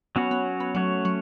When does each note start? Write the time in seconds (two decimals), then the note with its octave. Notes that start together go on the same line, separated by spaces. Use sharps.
0.16 F#3 B3 C#4 F#4 C#5
0.31 B3
0.60 B3
0.75 F#3 A3 C#4 F#4 C#5
1.05 F#3